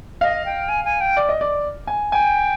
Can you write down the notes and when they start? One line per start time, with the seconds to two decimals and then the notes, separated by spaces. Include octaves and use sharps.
0.21 D#5 F5
0.46 G5
0.69 G#5
0.85 G#5
1.01 G5
1.17 D5
1.29 D#5
1.41 D5
1.87 G#5
2.11 G5 G#5